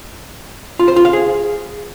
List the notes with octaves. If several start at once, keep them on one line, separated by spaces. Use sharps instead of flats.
F4
C5
F4
F5
G#4